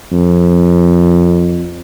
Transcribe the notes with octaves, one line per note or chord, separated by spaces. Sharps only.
F2